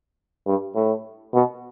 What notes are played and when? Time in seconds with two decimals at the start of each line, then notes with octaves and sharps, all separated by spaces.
0.47 G2
0.75 A2
1.34 B2